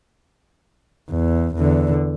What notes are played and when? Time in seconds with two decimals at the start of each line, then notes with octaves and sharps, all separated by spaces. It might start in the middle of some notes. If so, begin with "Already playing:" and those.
1.10 E2
1.56 E2 D3